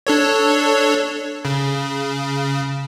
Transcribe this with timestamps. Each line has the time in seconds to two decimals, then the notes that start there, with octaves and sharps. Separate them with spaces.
0.07 D4 A4 C#5
1.45 C#3